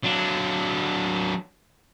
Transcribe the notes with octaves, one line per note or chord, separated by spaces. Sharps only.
F#3 D4